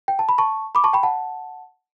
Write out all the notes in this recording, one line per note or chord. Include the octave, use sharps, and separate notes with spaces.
G5
A5
B5
A5 C#6
B5 D6
A5 C#6
G5 B5
F#5 A5